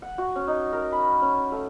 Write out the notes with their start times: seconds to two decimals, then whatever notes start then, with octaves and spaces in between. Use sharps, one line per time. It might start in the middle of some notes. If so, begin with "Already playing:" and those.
0.02 F#5
0.18 F#4
0.36 C#4
0.47 D#4
0.73 A#4
0.92 B5
1.22 C#4
1.52 A3